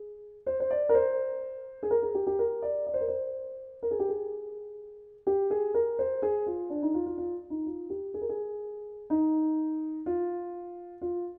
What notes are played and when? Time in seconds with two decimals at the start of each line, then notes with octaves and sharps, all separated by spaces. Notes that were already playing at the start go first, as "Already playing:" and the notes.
Already playing: G#4
0.46 C5
0.60 C5
0.71 D5
0.89 A#4
0.94 C5
1.83 G#4
1.91 A#4
2.02 G#4
2.15 G4
2.27 G4
2.39 A#4
2.62 D5
2.87 D5
2.94 C5
3.01 A#4
3.08 C5
3.83 A#4
3.91 G#4
4.00 G4
4.08 G#4
5.27 G4
5.50 G#4
5.74 A#4
5.99 C5
6.22 G#4
6.47 F4
6.70 D4
6.83 D#4
6.94 F4
7.06 F4
7.18 F4
7.50 D#4
7.66 F4
7.90 G4
8.14 G#4
8.22 A#4
8.29 G#4
9.10 D#4
10.06 F4
11.01 F4